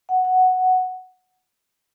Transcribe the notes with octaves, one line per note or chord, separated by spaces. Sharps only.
F#5
F#5